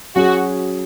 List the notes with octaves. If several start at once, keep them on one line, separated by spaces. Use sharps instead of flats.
F#3 C#4 F#4 G#4